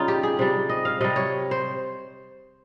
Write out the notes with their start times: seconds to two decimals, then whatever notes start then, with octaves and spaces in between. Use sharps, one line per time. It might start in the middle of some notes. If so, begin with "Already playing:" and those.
Already playing: C#3 G3 D#4 F4
0.08 G4
0.23 G#4
0.39 C3 G3
0.69 D#5
0.85 F5
1.01 C3 G3 D#5
1.16 C#5
1.51 C5